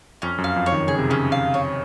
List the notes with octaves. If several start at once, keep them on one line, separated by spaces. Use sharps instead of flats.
F2 C#4
F#2
F5
F2
C#5
D#3
C#3 G#4
C3
C#3 C#4
F5
C#5